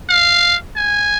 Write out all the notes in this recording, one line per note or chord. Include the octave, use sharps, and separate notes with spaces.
F5
G#5